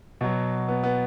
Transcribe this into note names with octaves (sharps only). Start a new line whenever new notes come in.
B2 F#3
B3
B3